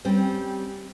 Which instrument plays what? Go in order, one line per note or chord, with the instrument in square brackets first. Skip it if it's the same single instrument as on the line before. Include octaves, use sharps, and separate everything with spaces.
[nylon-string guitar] G3 C4 C#4